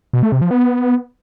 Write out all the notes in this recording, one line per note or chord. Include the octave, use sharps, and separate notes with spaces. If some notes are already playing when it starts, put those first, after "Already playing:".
B2
A3
C3
F3
B3